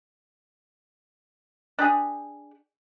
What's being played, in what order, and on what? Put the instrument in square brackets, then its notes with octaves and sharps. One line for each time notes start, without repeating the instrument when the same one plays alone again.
[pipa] D4 G4 G#4